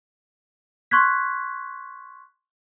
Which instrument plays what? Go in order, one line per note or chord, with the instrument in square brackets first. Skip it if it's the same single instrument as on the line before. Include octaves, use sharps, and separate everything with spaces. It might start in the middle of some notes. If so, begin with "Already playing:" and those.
[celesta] C6 C#6 F6 F#6 G#6 B6